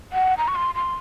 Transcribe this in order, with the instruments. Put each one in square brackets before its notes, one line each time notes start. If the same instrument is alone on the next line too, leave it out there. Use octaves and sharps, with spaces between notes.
[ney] F#5
A#5
C#6
C6
C6